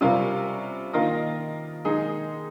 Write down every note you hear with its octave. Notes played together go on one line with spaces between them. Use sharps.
C3 G3 C#4 F4 A#4
D#3 A#3 F4 A#4 D#5
D#3 G#3 D#4 G#4